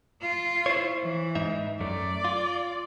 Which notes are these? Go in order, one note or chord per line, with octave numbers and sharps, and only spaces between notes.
F4
E4 C5 C#5
E3
G#2 D#4 E5
F#2 A3 D5
F4